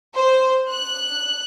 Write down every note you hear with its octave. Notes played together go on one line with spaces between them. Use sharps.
C5
F#6